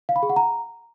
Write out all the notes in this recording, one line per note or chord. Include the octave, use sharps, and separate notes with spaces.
F5
B5
G#4
F#5
A#5